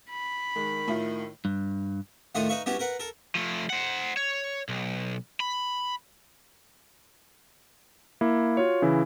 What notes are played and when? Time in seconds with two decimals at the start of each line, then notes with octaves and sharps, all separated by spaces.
0.10 B5
0.56 D#3 G#3
0.88 A2 E4 F4
1.45 G2
2.35 A2 D#3 A3 F4 F#5 D#6
2.49 D#4 B4 E5 F5 C#6
2.66 G3 B3 C#4 E4 F#4
2.79 A#4 B4 F#5
3.00 A4 A#4
3.35 F3 A3
3.70 C5 F#5
4.17 C#5
4.69 B1
5.40 B5
8.21 A#3 E4
8.57 F4 F#4 C#5
8.82 C#3 E3 E4